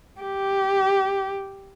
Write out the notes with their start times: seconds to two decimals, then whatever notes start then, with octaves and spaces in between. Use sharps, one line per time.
0.21 G4